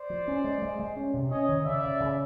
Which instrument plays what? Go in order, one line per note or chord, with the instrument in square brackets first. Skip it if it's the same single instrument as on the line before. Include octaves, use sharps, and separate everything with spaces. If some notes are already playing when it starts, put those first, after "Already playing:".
Already playing: [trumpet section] C5 D5
[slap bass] F3
C#4
G#3
G#3
G#3
C#4
C3
[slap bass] C#4 [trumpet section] C#5 D#5
[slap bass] D#3
[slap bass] C#3 [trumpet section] D5 E5
[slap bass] C#3
C#3